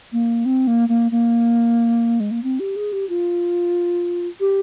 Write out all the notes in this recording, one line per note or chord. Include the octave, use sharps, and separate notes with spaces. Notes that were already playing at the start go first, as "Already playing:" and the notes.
A#3
C4
A#3
A#3
A#3
G#3
A#3
C4
G4
G#4
G4
F4
G4